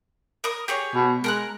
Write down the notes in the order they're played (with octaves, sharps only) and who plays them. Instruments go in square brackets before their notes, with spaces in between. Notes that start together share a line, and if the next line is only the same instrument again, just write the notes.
[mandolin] A#4 D#6
G4 G#4 C#5
[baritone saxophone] B2
[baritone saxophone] G#3 [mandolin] A#4 A#5 F#6